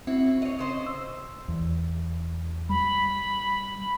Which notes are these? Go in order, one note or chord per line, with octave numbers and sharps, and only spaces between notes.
C4 E4 F#4
C#5 D#5
C#3 C5 D#5
E6
E2
G3 B5